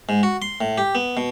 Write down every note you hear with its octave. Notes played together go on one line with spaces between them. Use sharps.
G#2
F#4
C6
A2
G4
B3
B2